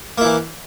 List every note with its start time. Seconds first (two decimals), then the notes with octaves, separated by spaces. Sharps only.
0.18 A#3
0.21 E4
0.24 E3